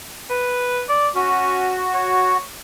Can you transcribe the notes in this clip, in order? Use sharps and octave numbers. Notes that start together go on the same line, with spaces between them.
B4
D5
C#4 F#4
C#5